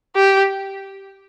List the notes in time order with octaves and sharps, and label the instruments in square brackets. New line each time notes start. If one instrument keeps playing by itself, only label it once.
[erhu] G4